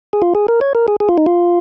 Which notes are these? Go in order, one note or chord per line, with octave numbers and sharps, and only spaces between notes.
G#4
F4
G#4
A#4
C#5
A#4
G#4
G#4
F4
D#4
F4